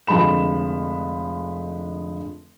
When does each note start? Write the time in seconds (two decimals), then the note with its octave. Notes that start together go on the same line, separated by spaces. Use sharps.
0.07 F1 D3 F3 G#3 B5 E7